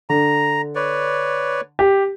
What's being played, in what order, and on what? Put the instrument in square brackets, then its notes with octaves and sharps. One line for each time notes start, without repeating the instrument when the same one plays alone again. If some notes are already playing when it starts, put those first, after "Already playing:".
[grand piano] D3 [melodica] A#5
[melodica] B4 C#5 D5
[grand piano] G4